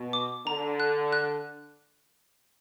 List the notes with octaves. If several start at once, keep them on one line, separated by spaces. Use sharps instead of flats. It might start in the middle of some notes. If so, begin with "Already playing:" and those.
Already playing: B2
D6
D3 A#5
F#6
F#6